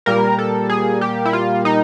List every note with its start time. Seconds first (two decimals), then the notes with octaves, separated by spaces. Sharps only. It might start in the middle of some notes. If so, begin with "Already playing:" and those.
0.06 A#2 G3 A#3 A#4
0.38 A4
0.70 G#4
1.01 G4
1.26 E4
1.33 F4
1.65 D#4